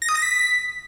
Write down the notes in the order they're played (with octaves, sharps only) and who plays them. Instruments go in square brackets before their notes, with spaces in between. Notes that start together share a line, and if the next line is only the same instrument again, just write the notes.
[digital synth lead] A#6
D#6
A#6
B6